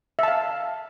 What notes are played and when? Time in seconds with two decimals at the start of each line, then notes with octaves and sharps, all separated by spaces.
0.19 E5
0.23 A5
0.28 F5